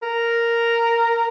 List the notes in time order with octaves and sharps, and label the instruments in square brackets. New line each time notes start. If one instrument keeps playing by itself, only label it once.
[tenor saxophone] A#4